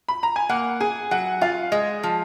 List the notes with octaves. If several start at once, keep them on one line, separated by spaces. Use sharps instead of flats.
B5
A#5
G#5
A#3 F#5
G#4 G#5
F#3 F#5
F4 F5
G#3 D#5
F3